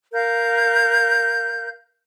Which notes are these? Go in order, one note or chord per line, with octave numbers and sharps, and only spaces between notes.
A#4 F5 G6